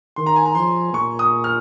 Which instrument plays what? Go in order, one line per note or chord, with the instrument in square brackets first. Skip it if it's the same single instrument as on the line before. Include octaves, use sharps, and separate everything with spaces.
[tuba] D#3 [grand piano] C6
[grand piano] A#5
G#5
A#5
[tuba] F3 [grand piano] C6
[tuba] A#2 [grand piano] C#6
[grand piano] D#6
F6